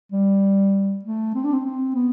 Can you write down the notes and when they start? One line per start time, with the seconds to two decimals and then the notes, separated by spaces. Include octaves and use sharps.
0.12 G3
1.05 A3
1.34 C4
1.44 D4
1.53 C4
1.65 C4
1.95 B3